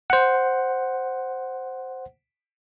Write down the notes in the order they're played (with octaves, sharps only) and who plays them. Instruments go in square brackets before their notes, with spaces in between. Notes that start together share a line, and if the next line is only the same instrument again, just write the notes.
[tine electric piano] C5 F#5